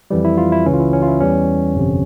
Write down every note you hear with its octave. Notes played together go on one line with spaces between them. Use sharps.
F2 E3 G3
E4
F4
E4
C#2 C#3 E3 C#4
F4
E4
C#4
F4
E4
E2 E3 G3 C#4
G1 F2 C3